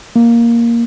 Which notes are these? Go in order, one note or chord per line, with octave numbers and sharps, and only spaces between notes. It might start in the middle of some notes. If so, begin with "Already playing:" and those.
A#3